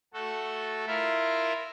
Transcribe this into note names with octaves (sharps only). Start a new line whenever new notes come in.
A3 F#4 A4
E4 F4 A#4 E5